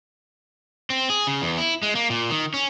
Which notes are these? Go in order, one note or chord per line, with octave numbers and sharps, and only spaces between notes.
C4
G#4
C#3
E2
E4
G#3
A#3
A#2
D#3
C#4